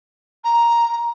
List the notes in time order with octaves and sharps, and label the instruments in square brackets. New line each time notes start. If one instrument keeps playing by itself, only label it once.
[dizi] A#5